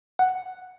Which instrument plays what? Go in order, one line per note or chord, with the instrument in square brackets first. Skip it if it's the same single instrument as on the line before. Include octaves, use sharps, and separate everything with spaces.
[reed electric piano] F#5